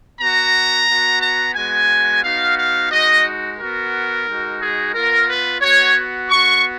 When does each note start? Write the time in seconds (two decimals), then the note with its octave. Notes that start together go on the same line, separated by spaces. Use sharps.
0.20 B3 F#4 A#5
0.88 B3 F#4
1.21 A#5
1.55 G#3 B3 F#4 G#5
2.23 B3 D#4 F#4 F5
2.58 F5
2.91 G#3 D#4 F#4 D#5
3.58 B3 F#4 A#4
4.27 G#3 D#4 F#4
4.60 G#4
4.94 B3 F4 A#4
5.29 B4
5.61 B3 F#4 C#5
6.30 B3 F#4 C#6